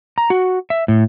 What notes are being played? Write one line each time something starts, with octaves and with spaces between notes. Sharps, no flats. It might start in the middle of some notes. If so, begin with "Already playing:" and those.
A#5
F#4
E5
A2